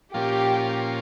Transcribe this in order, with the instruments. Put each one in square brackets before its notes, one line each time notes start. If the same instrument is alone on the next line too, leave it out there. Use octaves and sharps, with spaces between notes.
[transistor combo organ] A#2 F3 A#3 C#4 F4 [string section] G4